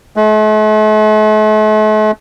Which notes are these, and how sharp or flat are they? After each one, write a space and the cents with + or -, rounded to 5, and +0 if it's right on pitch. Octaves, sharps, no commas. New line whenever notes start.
A3 -45